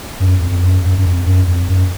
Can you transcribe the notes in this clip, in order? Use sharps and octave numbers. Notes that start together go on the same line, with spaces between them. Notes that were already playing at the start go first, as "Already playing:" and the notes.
F#2
F2
F2
F#2
F#2
F#2
F2
F#2
F2
F#2